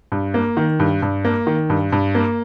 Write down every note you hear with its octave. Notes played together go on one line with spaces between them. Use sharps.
G2
A#3
D#3
G2
G2
A#3
D#3
G2
G2
A#3